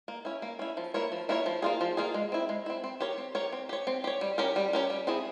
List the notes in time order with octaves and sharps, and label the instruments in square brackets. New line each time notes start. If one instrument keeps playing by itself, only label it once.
[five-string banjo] A#3
C#4 E4
A#3
C#4 E4
F3
A#3 E4 A#4 C#5
F3
A#3 E4 A#4 C#5
F3
A#3 F4 G#4
F3
A#3 F4 G#4
G#3
C4 E4
G#3
C4 E4
C4
G4 A#4 C#5
C4
G4 A#4 C#5
C4
G4 C#5
C4
G4 C#5
G3
C#4 G4 A#4
G3
C#4 G4 A#4
G3
C4 E4 G#4